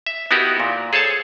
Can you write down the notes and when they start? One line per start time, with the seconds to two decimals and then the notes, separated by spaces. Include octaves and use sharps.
0.07 E5
0.31 B3 D#4 E4 F#4 G4 A#4
0.60 A#2
0.93 G#4 A4 C5 C#5 A5